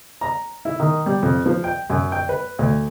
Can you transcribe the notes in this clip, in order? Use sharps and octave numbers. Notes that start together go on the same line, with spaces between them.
A#5
E4
D#3
G3
F2
F3
G5
F#2
G5
B4
D2